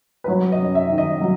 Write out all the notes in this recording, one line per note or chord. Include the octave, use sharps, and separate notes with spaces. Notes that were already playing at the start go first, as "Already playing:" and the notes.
B4
F#3 C#5
D#5
F#2
E5
D#3
D#5
F#3